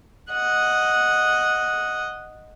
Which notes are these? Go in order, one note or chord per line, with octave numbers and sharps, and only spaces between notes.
D#5 F#5